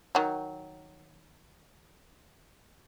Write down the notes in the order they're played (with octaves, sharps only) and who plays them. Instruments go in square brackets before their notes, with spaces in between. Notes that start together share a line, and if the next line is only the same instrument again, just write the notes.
[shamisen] D#3 F#3